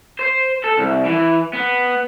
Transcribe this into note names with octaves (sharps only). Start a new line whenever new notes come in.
C5
A4
C2
E3
B3